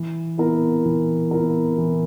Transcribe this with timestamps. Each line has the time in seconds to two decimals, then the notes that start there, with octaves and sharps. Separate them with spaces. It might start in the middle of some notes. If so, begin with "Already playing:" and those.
Already playing: E3
0.38 B3 E4 A#4
0.86 E3
1.31 B3 E4 A#4
1.78 E3